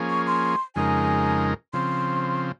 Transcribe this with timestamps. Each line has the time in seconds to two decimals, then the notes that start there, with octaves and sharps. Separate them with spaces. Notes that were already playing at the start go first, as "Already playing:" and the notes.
Already playing: F3 A#3 C#4 G#4
0.10 C#6
0.26 C6
0.75 F2 C#3 G#3 D#4 A#4 G#5
1.73 C#3 F3 C4 C6